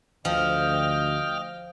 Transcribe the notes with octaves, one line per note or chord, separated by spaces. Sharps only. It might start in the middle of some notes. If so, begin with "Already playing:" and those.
D2 F3 D#5 G5 F6